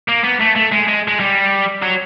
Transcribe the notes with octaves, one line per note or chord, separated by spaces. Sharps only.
A#3
B3
A3
A3
G#3
G#3
G#3
G3
F#3